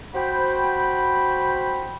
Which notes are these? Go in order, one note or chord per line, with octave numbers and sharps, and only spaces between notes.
F#4 C5 G5 B5